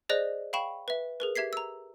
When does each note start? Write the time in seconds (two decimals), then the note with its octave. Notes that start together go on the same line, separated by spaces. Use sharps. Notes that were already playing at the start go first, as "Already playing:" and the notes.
0.09 G#4 C5 D5 D#5 F#6 A#6
0.53 F5 G5 B5 C#6 E7
0.88 B4 E5
1.20 G#4 A#4 B4
1.36 G4 E5 G#6 B6 C7
1.53 A#5 E6